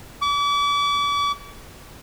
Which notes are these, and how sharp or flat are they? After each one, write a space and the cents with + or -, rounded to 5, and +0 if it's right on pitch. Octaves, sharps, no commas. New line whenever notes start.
D6 -40